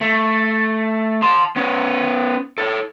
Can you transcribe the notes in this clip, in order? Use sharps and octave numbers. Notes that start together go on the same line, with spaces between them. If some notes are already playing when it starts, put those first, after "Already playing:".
A3
A5 C6
B3 C#4
A4 C#5